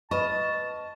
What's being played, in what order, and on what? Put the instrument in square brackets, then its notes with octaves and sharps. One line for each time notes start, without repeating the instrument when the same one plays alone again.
[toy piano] B4 B5 C#6 [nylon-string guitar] D#5 [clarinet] A5